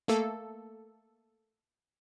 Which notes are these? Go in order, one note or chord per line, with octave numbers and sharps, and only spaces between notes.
A3 A#3 A4